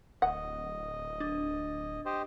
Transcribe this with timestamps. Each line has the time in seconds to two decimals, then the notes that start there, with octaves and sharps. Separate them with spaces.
0.22 D1 D#5 F#5
1.20 D4
2.05 G4 C5 D#5